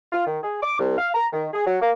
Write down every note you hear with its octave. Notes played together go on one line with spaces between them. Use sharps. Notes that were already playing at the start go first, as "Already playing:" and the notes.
F4
D#3
G#4
D6
C2
F5
A#5
D#3
G#4
F#3
A#3